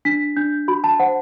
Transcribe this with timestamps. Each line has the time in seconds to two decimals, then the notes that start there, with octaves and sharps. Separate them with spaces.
0.05 D4 B6
0.36 D4 G6
0.68 F#4 B5
0.84 A5
0.99 C5 F#5